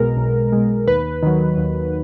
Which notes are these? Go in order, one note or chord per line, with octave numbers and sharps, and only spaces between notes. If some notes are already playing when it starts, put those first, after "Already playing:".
Already playing: B1 B2 G#3 A#4
B1
B2 G#3
D#2 B4
D#3 F#3
D#2